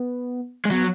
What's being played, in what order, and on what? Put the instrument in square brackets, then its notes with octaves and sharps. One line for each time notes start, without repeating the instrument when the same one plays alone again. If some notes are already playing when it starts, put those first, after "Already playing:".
Already playing: [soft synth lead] B3
[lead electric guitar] G#3
[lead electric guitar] F#3 [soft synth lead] B3